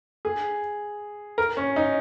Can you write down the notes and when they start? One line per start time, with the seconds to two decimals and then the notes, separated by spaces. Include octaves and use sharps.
0.25 G#4
1.38 A#4
1.57 C#4
1.76 D#4